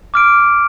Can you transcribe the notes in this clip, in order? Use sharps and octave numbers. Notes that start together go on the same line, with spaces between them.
D6 F6 D7